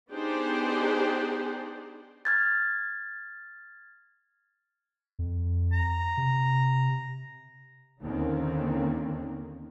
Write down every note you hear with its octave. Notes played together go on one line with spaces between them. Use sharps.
B3 D4 D#4 G4 G#4 C5
F6 G#6 A6
F2
A#5
C3
D#2 D3 D#3 A#3 C4 C#4